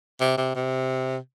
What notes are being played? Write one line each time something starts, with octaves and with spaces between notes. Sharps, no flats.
C3
C3
C3